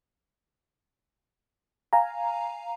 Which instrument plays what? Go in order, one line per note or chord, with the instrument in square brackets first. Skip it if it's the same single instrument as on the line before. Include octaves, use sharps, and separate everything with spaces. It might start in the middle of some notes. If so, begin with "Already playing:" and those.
[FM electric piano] F5 G#5 A#5